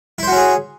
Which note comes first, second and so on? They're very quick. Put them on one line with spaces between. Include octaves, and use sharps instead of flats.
E4 C5 F#4 C#4 G#4